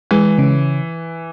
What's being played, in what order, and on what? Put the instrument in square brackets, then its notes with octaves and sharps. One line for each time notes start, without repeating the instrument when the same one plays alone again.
[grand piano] E3 [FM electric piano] G#3
[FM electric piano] C#3